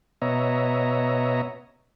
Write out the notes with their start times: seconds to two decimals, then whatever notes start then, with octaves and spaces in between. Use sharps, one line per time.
0.22 B2 B3 C#5 D#5 E5 A#5